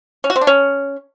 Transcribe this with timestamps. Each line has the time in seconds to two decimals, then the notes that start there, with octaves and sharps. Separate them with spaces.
0.24 C#4
0.30 F#4
0.36 C4
0.41 D4
0.47 C#4